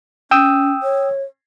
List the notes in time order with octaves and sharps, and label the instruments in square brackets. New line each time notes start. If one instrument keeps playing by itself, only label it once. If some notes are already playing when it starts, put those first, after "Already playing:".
[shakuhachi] C#4 [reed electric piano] G5 D#6 E6
[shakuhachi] C#5